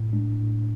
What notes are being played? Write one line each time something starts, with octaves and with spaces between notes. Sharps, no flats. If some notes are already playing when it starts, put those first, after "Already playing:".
Already playing: A2
G#3 D4
A2